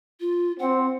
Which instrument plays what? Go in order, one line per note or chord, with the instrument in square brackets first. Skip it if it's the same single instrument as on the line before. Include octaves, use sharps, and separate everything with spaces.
[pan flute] F4
[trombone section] C4 [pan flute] F#5